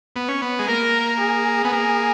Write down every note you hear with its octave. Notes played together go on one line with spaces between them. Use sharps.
B3
C#4
B3
G#3
A#3 A#4
G#4
B3
A#3